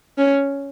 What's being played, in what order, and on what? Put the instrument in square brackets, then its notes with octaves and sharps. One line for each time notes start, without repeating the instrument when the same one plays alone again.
[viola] C#4